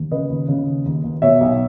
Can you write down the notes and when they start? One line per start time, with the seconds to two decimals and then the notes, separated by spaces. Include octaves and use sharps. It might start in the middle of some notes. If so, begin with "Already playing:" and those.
Already playing: D#2
0.11 C#3 B4 D#5
0.30 D#2
0.48 C#3
0.67 D#2
0.86 D#2
1.04 D#2
1.22 B2 C#5 E5
1.41 B1